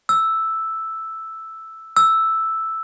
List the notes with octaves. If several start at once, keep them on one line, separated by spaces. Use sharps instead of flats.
E6
E6